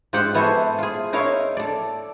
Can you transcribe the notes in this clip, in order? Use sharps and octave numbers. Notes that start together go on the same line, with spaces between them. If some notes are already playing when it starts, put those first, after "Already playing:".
G#2 F4 G4 C5 F#5 G5
B3 E4 F#4 A4 C5 G#5
F4 G#4
D#4 E4 A#4 C#5 E5 F5
A4 D5